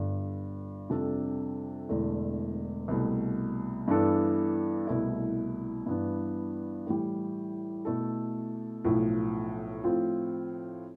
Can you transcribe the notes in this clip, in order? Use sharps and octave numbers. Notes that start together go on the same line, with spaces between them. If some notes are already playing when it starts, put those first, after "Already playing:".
Already playing: G1 G2 D3
F2 C3 G3 D4 A4
E1 E2 D3 A3
C2 B2 A3
G2 E3 B3 D4 A4
C2 B2 A3 E4
G2 E3 B3 D4
A2 E3 G3
B2 A3 E4 A4
B1 A2 F3
A2 F3 C4 F4